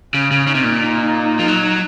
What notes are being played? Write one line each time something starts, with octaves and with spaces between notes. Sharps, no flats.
C#3 C#4
C#3
C#3 D#4
C3
A#2
F3
F#3